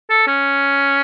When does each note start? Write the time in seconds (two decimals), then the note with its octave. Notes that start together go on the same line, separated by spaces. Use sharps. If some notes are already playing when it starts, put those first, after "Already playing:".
0.10 A4
0.27 C#4